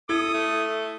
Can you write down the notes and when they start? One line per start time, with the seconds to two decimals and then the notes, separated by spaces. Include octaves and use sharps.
0.09 E4 A4 D#6 G#6
0.34 A3